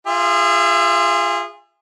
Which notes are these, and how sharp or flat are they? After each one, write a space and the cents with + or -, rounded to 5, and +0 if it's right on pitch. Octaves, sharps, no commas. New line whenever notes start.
F4 +0 G#4 -25 E5 +30